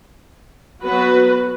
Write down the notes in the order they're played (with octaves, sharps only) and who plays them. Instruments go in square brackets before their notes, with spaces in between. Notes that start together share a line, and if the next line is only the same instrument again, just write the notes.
[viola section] F#3 B3 F#4 B4